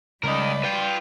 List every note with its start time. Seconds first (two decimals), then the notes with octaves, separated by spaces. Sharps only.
0.24 C#2 G3 A#4 D5 D#5 B5
0.64 F4 B4 G5